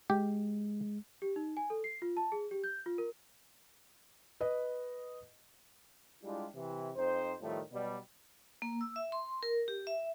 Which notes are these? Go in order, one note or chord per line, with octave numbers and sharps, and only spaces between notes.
G#3 G4
G4
D#4
G#5
A4
C7
F4
A5
G#4
G4
G6
F4
A#4
B4 D#5
G3 G#3 D4 E4 F4 G4
C3 E3
F2 C4 D#4 C5
F2 A2 D#3 F3 G3 A3
B2 F#3 G3
A#3
E6
E5
C6
A#4
G4
E5